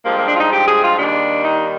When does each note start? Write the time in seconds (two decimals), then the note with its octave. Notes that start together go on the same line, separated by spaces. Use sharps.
0.05 G2 F3 G#3 A#3
0.16 A#3
0.28 D4
0.35 F4
0.40 D#4
0.51 G4
0.67 G#4
0.83 F4
0.97 D#2 D#3 G3 D4
1.44 D#4